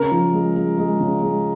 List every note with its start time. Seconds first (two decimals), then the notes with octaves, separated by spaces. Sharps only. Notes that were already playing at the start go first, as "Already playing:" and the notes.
Already playing: C#3 A#4
0.12 F3
0.33 G#3
0.56 G#3
0.78 G#3
1.00 C#3
1.22 G#3